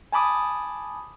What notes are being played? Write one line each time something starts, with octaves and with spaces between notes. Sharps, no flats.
G#5 A5 B5 D6 D#6